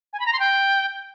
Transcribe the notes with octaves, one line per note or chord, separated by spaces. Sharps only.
G#5
B5
A#5
C6
G5